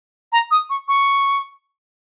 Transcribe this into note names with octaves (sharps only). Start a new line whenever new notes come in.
A#5
D#6
C#6
C#6